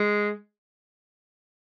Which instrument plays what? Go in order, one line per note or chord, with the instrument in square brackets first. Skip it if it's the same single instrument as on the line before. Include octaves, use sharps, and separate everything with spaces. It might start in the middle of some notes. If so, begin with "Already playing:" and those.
Already playing: [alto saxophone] G#3